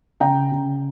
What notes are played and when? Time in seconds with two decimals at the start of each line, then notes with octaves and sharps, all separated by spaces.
0.20 C#3 G5 A#5
0.52 C#3